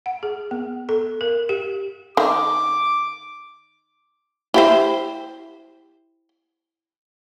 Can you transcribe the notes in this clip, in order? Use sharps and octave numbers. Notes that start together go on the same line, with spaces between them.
F#5
G#4
B3
A4
A#4
G4
D#3 D6
E4 G4 C5